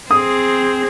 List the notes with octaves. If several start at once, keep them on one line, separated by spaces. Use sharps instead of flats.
C4 G#4 D#6